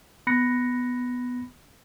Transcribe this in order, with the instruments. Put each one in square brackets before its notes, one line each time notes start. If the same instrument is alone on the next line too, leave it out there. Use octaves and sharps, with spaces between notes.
[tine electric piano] B3 B5 F#6 A#6 C#7